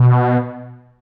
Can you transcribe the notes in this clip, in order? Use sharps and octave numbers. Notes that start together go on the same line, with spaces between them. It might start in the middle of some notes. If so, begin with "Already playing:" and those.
Already playing: B2